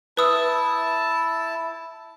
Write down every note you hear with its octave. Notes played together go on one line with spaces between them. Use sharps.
E4 B4 A5 D#6 E6